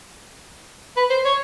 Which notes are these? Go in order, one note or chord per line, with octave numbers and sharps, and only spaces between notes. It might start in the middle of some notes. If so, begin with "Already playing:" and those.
B4
C5
C#5